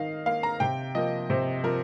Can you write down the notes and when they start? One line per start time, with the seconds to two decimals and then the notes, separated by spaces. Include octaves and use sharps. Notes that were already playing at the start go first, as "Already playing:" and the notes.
Already playing: D#3 D#5 F5
0.26 A#3 F5
0.43 A#5
0.60 C3 G5
0.95 F3 A#3 D#5
1.30 C3 C5
1.64 F3 A#4